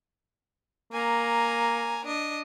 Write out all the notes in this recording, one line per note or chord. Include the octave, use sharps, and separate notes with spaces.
A#3 G#5 A#5
D4 D#5